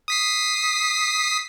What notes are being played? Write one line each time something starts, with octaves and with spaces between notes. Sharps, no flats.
D#6 B6 C7